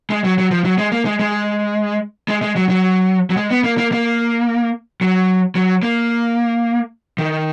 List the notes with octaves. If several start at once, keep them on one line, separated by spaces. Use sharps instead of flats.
G#3
F#3
F#3
F3
F#3
G#3
A#3
G#3
G#3
G#3
G#3
F#3
F#3
F#3
G#3
B3
A#3
A#3
A#3
F#3
F#3
A#3
D#3